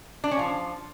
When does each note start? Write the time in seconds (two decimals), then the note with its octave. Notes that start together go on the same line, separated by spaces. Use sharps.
0.24 D4
0.31 C#4
0.39 F3